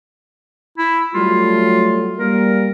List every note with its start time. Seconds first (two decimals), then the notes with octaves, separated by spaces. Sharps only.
0.78 E4
1.14 F#3 G3 A3 F4
2.19 G3 A#3 A#4